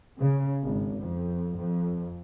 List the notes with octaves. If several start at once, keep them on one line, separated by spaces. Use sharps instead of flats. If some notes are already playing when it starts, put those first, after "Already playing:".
C#3
G#1
F2
F2